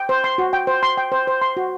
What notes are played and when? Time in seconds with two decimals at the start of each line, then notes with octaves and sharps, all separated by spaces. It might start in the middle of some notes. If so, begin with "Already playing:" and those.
Already playing: G5
0.09 C5
0.24 C6
0.38 F#4
0.53 G5
0.67 C5
0.83 C6
0.97 G5
1.12 C5
1.27 C5
1.42 C6
1.57 F#4